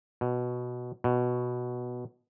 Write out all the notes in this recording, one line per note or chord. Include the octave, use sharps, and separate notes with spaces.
B2
B2